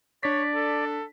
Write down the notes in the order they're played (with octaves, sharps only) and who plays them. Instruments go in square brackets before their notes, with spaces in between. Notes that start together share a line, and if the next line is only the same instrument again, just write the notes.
[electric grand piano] D4 B6 [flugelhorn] C#5 [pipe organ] D5
[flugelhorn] A4